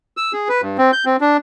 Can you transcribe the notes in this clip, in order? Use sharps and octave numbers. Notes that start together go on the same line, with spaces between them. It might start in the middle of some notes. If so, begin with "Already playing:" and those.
E6
G#4
B4
G2
C4
G6
C4
D4